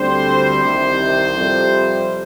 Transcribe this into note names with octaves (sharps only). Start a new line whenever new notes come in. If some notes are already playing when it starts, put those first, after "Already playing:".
Already playing: D2 D3 G3 C4 C5
C2 C3 D#3
F2 C3 G3